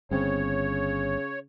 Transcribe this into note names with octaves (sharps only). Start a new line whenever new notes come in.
G1 C#3 C4 C#5